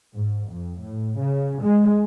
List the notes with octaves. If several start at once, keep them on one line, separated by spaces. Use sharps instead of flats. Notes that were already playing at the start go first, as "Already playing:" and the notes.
G#2
F2
A2
C#3
G#3